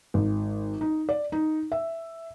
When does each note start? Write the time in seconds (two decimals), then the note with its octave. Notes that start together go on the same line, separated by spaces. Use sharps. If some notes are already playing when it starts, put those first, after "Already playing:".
0.14 G#1
0.81 D#4
1.09 D5
1.32 D#4
1.72 E5